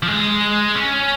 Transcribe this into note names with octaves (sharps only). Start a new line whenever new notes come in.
F3
G#3
C#4